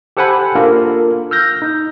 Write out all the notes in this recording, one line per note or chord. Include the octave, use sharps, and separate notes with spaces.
G4 A4 C5 F#5 G#5 B5
A#3 D4 F4 A4 A#4
E6 F6 G6 A#6
D#4